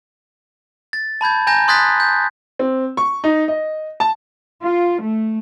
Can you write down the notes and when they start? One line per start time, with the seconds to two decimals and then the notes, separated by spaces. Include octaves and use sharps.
0.93 A6
1.21 A5 B5 G6 G#6
1.47 G#5 A#5 G6 A#6
1.68 C6 D#6 F#6 G#6 A6 B6
2.00 G6
2.59 C4
2.97 C#6
3.24 D#4
3.48 D#5
4.00 A5
4.62 F4
5.02 A3